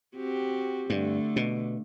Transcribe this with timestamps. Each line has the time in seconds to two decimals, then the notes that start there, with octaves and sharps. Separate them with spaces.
0.16 C4 F#4 G4
0.90 G2 D3 A3
1.36 B2